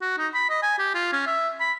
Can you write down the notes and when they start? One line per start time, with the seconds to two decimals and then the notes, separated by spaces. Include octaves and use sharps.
0.02 F#4
0.18 D#4
0.34 B5
0.50 D#5
0.63 G#5
0.79 G4
0.95 F4
1.13 C#4
1.27 E5
1.60 B5